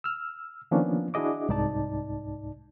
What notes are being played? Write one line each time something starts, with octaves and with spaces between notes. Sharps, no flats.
E6 F6
D#3 F3 A#3 B3 C#4 D4
D4 E4 F#4 G#4 D#5 D6
C2 G#2 D#4 D5 A5